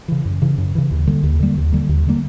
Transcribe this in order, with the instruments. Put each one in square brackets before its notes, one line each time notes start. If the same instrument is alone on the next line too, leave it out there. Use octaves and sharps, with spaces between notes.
[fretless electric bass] C#3 E3
F#2
C#3 E3
F#2
C#3 E3
D#2
D3 G3 A#3
D#2
D3 G3 A#3
D#2
D3 G3 A#3
D#2
D3 G3 A#3